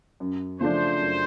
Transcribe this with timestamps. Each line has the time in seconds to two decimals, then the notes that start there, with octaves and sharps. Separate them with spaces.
0.20 F#2
0.60 C#3 F3 A3 D4 C5
1.01 F#2